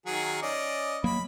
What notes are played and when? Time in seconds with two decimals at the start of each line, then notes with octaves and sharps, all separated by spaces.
0.06 D#3 F#3 G#4
0.42 C#4 D5 D#5
1.04 F#3 A#3 B5